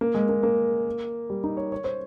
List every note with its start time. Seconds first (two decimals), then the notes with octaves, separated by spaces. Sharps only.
0.01 A#3
0.15 G#3
0.29 A#3
0.43 A#3
1.30 G3
1.44 D#4
1.57 C#5
1.72 C#5
1.84 C5